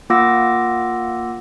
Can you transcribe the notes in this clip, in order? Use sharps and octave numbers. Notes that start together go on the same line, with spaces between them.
A#3 F4 F#5 D6 E6 A#6